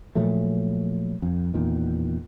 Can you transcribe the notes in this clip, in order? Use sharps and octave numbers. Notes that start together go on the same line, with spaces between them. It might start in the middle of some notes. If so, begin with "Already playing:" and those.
A#2 F3 F#3 A3
F2
E2 A#2 D#3